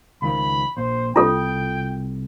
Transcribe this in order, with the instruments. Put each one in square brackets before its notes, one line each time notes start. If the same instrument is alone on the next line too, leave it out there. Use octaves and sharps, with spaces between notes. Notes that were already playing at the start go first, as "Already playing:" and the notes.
[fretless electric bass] C#2 D#3 F3 [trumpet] B5
[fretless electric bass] A#1 [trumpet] C5
[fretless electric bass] C2 [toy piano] F4 A4 [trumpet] G5